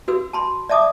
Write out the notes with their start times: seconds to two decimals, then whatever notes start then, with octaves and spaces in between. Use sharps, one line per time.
0.08 F#4 B4 E6
0.33 A5 B5 C6
0.69 D5 E5 A5 D6 D#6